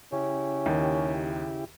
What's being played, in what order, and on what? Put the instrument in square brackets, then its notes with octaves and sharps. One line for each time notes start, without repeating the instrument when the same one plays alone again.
[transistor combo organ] C#3 E4 G4 [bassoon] C#4
[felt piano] D#2 D#3